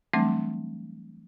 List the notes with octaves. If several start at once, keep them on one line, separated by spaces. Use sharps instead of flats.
E3 F#3 G3 A3 C4 D4